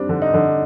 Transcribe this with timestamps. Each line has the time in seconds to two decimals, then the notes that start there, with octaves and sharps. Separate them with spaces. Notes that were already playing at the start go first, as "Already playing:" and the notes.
Already playing: G3 C4 D4
0.09 D3
0.22 D#4
0.34 D3